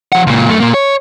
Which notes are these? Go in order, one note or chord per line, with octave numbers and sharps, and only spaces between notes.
F3 F#5
C#2 A#2
F#2 A3
A#2 A#3
C#5